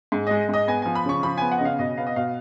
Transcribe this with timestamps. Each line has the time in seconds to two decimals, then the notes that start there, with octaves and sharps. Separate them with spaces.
0.12 G#2
0.27 G#3 D#5
0.49 G#2 D#5
0.67 B3 G#5
0.82 F3 G#5
0.95 B5
1.05 C#3 C#6
1.23 F3 B5
1.38 B3 G#5
1.52 F#5
1.58 C#3 D#5
1.65 F5
1.79 B2 D#5
1.97 B3 F5
2.07 D#5
2.16 B2 F5